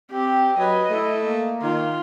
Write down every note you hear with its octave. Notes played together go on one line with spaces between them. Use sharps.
C4 G4
F#3 B4 D#5
A3 E4
A#3
D#3 F4